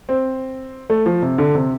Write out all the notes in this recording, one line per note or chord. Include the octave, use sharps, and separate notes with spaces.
C4
A3
F3
C3
D3
C3